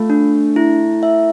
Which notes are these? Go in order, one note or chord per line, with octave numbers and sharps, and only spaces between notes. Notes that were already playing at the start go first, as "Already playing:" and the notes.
Already playing: A3 F4
D4
E4
E5